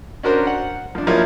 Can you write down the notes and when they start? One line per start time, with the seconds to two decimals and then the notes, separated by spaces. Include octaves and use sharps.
0.23 C#4 D4 F#4 A#4 C5
0.47 F#5
0.95 F3 D4
1.07 F3 F#3 A#3 E4 C#5